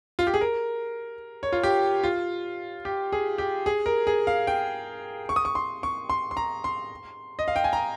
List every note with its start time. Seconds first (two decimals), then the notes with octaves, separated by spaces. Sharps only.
0.19 F4
0.27 G4
0.34 G#4
0.41 A#4
1.43 C#5
1.52 F4
1.63 G4
2.04 F4
2.85 G4
3.12 G#4
3.38 G4
3.66 G#4
3.86 A#4
4.07 G#4
4.27 F5
4.47 G5
5.29 C#6
5.36 D#6
5.45 C#6
5.55 C6
5.83 C#6
6.10 C6
6.31 C6
6.37 A#5
6.64 C6
7.39 D#5
7.48 F5
7.56 G5
7.64 G#5
7.73 A#5